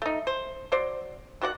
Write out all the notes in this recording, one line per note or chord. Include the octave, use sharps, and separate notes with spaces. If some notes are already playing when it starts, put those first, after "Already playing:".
A3 D#4
C5
F#3 C5 D5
D#3 F#4 D5 F#5